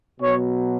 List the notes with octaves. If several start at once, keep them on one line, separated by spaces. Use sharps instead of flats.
B2 F#3 C#5